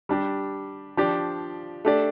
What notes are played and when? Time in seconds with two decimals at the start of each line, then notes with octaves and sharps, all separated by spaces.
0.09 G3 D4 G4
0.97 F3 D4 G4 D5
1.85 A3 D4 G4 D5